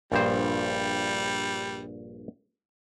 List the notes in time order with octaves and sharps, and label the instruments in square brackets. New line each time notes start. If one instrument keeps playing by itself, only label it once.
[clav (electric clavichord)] A#1 G2 C5 [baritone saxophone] G3